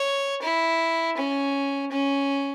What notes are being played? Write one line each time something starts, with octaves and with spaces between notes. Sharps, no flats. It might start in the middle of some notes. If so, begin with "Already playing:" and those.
Already playing: C#5
E4
C#4
C#4